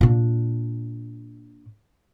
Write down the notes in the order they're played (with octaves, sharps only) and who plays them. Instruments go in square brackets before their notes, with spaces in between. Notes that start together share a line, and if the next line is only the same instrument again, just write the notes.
[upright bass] A#2 D4